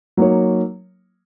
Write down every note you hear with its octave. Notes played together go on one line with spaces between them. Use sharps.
F#3 A#3 D#4 A#4 C#5